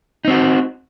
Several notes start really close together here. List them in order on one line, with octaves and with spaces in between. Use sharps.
D#4 C4 F#4